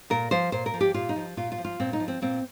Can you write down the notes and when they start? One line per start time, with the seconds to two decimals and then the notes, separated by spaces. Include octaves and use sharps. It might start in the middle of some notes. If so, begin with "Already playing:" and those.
0.10 A#2 A#4
0.31 F3 C5
0.52 A#2 C5
0.66 A#4
0.74 F3
0.81 G4
0.94 A#2 F4
1.09 D#4
1.16 F3
1.37 A#2 F4
1.52 F4
1.58 F3
1.65 F4
1.80 A#2 C4
1.93 D#4
2.00 F3
2.08 C4
2.22 A#2 C4